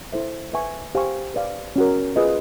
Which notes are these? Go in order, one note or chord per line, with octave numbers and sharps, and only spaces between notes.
E4 A4 C5 E5
B4 E5 G#5 C#6
G4 C5 F5 G#5 C#6
B4 D5 F5
C#4 F#4 A#4
F4 G#4 B4 D#5